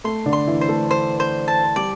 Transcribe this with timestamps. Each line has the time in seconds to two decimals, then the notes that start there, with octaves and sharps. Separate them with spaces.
0.04 A3 C6
0.26 D3 D4
0.33 C6
0.47 E3 E4
0.61 C5
0.69 A3 A4
0.91 C5
1.20 C5
1.48 A5
1.76 G3 G4 D5